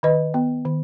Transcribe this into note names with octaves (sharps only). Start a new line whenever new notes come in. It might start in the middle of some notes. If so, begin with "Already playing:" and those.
D#3 B4 D#5
B3
D#3